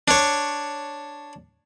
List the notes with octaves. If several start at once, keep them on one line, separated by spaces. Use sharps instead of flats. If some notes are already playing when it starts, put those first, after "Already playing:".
D4 C#5